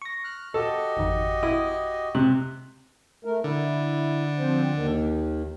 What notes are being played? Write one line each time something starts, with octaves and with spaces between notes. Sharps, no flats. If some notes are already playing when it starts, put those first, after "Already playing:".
C#6 A#6
F6 F#6
F#4 G4 A4 D#5
G#1 F2 D#3
E4 D#6
C3 F#6
A3 A#4
D3 E4
F3 C4 C5
D#2 D#3